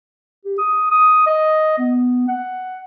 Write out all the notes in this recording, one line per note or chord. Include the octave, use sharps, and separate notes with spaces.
G4
D#6
D#6
D#5
B3
F#5